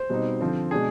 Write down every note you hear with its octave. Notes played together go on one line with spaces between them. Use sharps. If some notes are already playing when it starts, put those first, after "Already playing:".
Already playing: C5
B2 G3 C4 D#4
D3 F3 C4
B2 G#3 D4 G#4